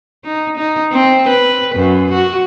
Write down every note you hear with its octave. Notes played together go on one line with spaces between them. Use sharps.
D#4
D#4
C4
B4
F#2
F#4